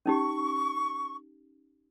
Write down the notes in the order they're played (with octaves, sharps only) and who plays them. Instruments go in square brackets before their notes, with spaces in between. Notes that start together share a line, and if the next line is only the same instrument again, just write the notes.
[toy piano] C#4 D#4 G4 [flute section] C#6